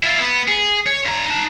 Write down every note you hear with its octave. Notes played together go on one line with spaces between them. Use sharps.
E4 F4
B3
G#4
C#5
G2 A#5
D#4 A5